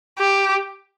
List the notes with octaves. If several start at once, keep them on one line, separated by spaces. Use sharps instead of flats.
G4